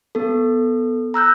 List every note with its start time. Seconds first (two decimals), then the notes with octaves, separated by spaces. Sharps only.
0.15 B3 A4
1.14 A#5 E6 F#6 G6